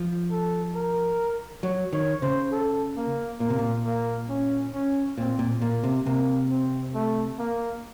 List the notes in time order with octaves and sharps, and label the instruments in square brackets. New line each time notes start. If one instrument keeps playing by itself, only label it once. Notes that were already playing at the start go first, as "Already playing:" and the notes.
Already playing: [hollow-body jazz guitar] F3
[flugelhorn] A4
A#4
[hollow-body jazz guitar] F#3 [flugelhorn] C#5
[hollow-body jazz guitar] D#3 [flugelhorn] C#5
[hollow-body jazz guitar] C#3 [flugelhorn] C5
[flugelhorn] A4
A#3
[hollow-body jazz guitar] A#2 [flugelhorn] A#3
[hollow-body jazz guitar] C3
A#2
[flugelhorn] A#3
C#4
C#4
[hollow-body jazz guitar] A#2 [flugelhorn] C4
[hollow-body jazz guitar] A#2
[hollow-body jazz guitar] A#2 [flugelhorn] A#3
[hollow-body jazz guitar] C3
[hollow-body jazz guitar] C3 [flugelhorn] A#3
[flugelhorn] C4
A3
A#3